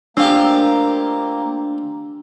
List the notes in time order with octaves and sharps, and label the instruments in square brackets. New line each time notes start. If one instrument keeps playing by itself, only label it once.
[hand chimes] A3 D4 E6 [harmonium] A#3 [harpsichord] C4 F4 G4